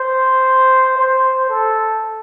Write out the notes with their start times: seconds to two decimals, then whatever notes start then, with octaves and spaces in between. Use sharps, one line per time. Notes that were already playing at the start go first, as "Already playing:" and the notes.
Already playing: C5
0.97 C5
1.49 A4